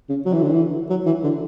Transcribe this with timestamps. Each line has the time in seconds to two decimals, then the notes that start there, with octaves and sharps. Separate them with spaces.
0.10 C#3
0.26 F#3
0.33 E3
0.42 D3
0.51 E3
0.90 F#3
1.06 E3
1.24 D3